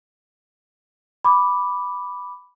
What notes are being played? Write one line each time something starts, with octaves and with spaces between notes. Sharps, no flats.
B5 D6